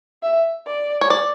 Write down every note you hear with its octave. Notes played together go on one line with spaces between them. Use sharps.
E5
D5
C#5
D5